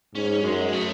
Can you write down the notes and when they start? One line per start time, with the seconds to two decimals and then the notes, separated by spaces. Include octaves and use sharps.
0.15 G#2 C#4
0.43 F#2 G#3
0.72 A3